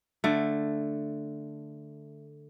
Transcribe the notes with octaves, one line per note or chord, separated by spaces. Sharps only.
D3 A3